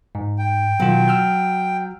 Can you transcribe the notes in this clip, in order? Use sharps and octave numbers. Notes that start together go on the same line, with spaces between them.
G#2
G5
B2 D#3 F#3 F4
E6 F6 G6